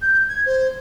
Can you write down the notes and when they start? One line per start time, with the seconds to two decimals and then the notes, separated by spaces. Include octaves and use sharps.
0.02 G6
0.29 G#6
0.46 C5